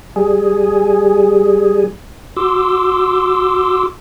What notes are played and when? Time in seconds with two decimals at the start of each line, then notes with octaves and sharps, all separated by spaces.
0.16 G3 G#4
2.37 F#4 C6 D6 E6